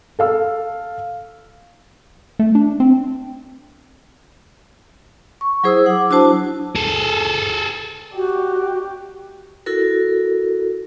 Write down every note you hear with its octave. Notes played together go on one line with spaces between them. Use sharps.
A4 F5 E6
A3
D4
C4
C#6
F#3 E4 G#4 C5 D#6 E6
F#5 D6
F#3 D4 E4 F#4 C5 A5
G#4 A4
F#4 G4
E4 F#4 A4 A#4